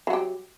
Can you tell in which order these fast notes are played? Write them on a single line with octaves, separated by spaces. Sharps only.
F#3 F#4 G4